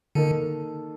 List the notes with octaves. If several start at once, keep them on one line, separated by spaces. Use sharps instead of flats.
D3 D#3 A#3 D#4 A4